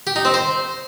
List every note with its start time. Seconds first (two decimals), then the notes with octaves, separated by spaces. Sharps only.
0.07 G4
0.16 D#4
0.25 C4
0.34 C5